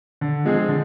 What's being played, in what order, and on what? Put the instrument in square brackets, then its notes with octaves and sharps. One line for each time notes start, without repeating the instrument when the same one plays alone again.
[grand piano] D3
F3 G#3 C4 G#4
D3